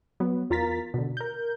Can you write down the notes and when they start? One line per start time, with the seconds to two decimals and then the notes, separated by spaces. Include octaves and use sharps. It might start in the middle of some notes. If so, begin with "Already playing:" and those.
0.20 F#3 B3
0.50 E2 F4 A#4 A#5 A6 B6
0.94 B2 D3
1.17 A#4 G6